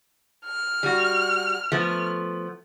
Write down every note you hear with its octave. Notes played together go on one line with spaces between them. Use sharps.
F6
G3 F#4
F3 A3 B3